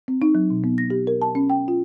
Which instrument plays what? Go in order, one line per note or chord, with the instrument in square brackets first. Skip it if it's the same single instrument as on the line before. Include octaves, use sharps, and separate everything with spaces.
[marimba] C4
D#4
F#3
B2
B3
A#6
G4
A#4
A5
C#4
G5
F4